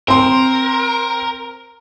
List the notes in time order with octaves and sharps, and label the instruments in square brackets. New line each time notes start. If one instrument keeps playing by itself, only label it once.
[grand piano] C4 C6 [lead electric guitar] A#4